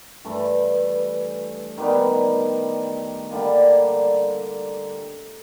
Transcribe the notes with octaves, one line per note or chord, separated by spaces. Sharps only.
G2 E3 A3
D#3 G3 B3
D3 G3 A#3